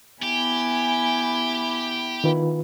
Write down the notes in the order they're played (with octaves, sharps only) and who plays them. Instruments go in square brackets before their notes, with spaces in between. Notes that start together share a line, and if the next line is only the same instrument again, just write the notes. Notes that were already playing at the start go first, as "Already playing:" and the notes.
[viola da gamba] B3 E4 [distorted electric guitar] G4 [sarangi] G#5
[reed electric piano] D#3 F4 B4